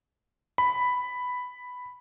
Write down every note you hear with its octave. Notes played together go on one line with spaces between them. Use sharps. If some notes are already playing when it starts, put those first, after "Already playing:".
B5